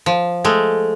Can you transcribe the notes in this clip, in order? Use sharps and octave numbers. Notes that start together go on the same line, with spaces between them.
F3
G#3 A3